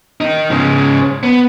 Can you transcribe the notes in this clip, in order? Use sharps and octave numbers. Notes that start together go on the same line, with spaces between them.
D#3 D#4
G#2 C#3
B3